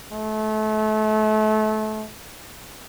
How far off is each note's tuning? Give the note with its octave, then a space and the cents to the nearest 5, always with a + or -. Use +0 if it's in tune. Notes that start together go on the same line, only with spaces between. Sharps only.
A3 -30